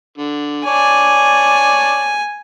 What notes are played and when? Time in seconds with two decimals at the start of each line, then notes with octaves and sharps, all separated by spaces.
0.18 D3
0.66 C#5 D5 G#5 A5